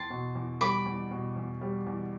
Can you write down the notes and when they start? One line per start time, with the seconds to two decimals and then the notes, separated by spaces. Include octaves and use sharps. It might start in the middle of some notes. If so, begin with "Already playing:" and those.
Already playing: E2 A5 C6
0.10 B2
0.35 E2
0.61 G3 B5 D6
0.86 E2
1.11 B2
1.36 E2
1.61 G3
1.87 E2